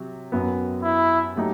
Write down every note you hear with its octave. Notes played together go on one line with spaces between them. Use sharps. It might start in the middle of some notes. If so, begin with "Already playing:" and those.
Already playing: C3 F#3
F#2 F#3 B3
E4
F#3 A3 D#4 G4